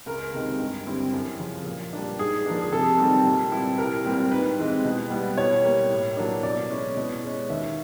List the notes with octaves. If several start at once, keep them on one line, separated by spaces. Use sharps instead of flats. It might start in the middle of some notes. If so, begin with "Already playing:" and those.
C#2 A#4
C3 D#3 G#3 C4
G2
D3 G3 C4 E4
F#2
C#3 F3
A#2
G3 A#3 D4
G#2 G#4
F3 A#3 D4
G#4
C3 A4
D#3 G3 C4
A#2
G3 C4 E4
C2 A#4
A#2 G3 C4
G#2 B4
E3 G#3 C4
B2
G3 B3 E4
B2 C#5
G3 A#3
A2
F#3 A#3 D4
B2 D5
G#3 C#4 E4
B2
G#3 C#4
D#2 E5